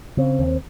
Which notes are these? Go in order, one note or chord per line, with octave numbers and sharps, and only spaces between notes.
C#3 C4
D#2